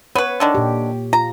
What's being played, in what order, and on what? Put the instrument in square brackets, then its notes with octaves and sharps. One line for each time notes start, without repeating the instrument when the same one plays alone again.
[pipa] B3 B4 [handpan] C#5
[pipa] D3 D#3 D4
[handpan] A#2 G4
[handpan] F4 [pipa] A#5